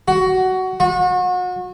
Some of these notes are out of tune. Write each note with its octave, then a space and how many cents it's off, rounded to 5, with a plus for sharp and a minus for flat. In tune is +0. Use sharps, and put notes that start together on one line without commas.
F#4 +15
F#4 -35